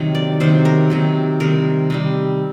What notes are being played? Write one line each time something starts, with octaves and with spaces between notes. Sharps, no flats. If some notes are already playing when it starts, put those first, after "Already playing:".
Already playing: C3 D#3 F#3
D5
C3 D#3 F#3 C5
A#4
C3 D#3 F#3
C3 D#3 G3 A#4
C3 D#3 G3